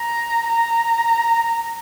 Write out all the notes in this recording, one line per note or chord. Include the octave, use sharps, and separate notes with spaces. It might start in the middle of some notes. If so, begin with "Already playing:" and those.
Already playing: A#5
A#5